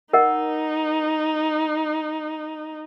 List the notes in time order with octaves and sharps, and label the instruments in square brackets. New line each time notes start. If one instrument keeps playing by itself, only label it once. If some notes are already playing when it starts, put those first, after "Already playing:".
[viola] D#4 [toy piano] A#4 D#5 F#5